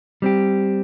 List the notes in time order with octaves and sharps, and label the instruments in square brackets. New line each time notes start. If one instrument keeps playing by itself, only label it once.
[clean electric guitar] G3 C4 G4